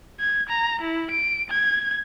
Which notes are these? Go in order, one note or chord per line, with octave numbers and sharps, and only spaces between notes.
G#6
A#5
E4
D7
G#6